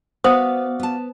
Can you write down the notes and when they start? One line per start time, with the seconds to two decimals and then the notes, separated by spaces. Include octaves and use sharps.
0.24 B3 F#4 C5 D5 F5 D#6
0.80 B3 A5